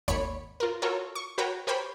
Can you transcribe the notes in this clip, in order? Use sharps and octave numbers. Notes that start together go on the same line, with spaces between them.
G#1 D#2 C#5 B5 C#7
F4 A#4
F4 F#4 A4 A#4 C#5
C#6
F#4 A#4 B4 C#5 G5 A#5
G4 A#4 C5 C#5 G5 B5